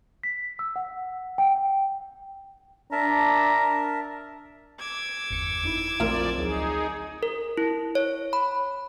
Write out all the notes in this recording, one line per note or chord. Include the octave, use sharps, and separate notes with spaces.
B6
E6
F#5
G5
D4 A#4 E5 A5 A#5
D6 E6 G#6
G1 E2 C#7
F2 D#4 E4
A#1 A2 F3 C4 A#4 D5 C6
D2 F#3 D#4 G#4
A#4
E4
C#5
B5